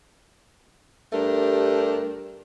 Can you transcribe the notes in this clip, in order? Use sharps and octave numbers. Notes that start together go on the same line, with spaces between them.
G2 A3 D4 G4 A#4